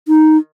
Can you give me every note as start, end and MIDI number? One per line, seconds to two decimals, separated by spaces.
0.08 0.37 63